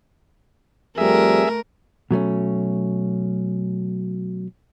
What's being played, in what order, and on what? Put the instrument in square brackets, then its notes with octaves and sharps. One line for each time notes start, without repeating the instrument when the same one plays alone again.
[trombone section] F2 G3 C4 [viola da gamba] A3 A#4 [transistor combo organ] G#4 E5
[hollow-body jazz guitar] B2 F#3 A3 C#4